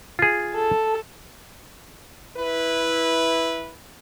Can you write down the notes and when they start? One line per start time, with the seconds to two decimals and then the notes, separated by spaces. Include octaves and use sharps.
0.19 F4 G#4
0.55 A4
2.38 E4 B4